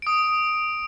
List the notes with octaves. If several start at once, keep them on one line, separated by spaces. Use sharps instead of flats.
D#6 D7